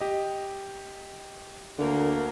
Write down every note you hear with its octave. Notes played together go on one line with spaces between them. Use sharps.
G4 D#5
D2 D3 A#3